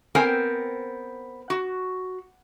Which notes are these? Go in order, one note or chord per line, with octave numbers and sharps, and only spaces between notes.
B3 C4 A#4 C5 G5 G#5
F#4